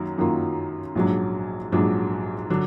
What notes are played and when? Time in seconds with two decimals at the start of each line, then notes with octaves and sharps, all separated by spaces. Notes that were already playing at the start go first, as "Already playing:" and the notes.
Already playing: F#2 D#3 F#3 A#3
0.18 F#2 D#3 F#3 A#3 F4
0.95 A#1 G#2 F#3 D4
1.72 A#1 G#2 F#3 D4
2.50 D3 F#3 D4